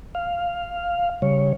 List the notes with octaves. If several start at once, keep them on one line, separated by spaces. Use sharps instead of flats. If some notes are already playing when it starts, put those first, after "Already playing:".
F5
C#3 G3 C#5